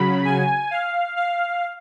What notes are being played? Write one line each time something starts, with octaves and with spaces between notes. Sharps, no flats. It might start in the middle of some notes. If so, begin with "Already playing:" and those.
Already playing: C#3 F#3 B5
G#5
F5
F5